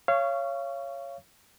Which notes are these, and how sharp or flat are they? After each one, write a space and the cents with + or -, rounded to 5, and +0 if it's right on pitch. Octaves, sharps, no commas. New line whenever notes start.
C#5 +0 F5 -30 C#6 +15